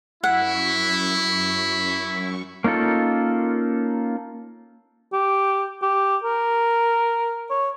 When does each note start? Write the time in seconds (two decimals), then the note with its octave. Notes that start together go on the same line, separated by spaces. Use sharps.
0.24 F#2 E4 F#5 C#6
2.64 A#3 C#4 D#4 F4 A4
5.13 G4
5.82 G4
6.23 A#4
7.50 C#5